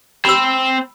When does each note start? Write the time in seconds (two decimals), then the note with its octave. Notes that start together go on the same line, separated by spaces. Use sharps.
0.25 C4 B5 E6